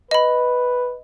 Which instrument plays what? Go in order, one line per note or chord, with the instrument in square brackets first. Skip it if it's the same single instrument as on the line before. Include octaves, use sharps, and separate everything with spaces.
[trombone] B4 [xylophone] D#5 B5